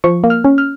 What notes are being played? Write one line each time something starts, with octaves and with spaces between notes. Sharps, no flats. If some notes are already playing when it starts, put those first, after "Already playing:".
F3 C#6
A#3
F6
C#4
F6